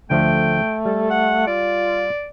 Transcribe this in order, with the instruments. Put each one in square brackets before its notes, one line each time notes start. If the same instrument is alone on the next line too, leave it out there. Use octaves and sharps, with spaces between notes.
[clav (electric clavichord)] D2 D3 F3 [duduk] A3 [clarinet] G5
[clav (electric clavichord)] G3 [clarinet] A4
[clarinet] F#5
[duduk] F4 [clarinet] D5